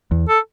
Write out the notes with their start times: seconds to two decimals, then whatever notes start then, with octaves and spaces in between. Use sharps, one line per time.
0.11 E2
0.28 A4